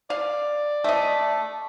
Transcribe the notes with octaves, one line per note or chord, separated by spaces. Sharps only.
D5 F5
A3 D#5